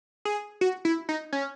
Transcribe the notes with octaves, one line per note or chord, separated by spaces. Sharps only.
G#4
F#4
E4
D#4
C#4